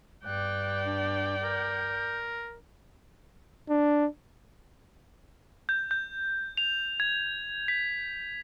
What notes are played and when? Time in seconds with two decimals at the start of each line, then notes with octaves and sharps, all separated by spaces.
0.24 G2 D5 G5 F#6
0.85 D4
1.43 A#4 G6
3.69 D4
5.69 G6
5.91 G6
6.57 F7
7.00 G#6
7.68 B6